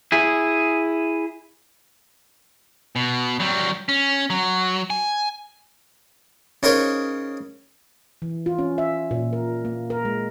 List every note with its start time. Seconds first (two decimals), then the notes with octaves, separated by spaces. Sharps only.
0.12 E4 G#4
2.96 B2
3.40 F#3 G3
3.89 C#4
4.30 F#3
4.90 G#5
6.63 C#3 D#4 A#4 C5 C#5
8.22 E3
8.46 F4
8.59 C#4
8.78 E5
9.11 A#2
9.33 A#4
9.65 A#3
9.90 A#4
10.05 G#3